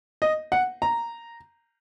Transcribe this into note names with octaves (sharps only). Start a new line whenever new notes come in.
D#5
F#5
A#5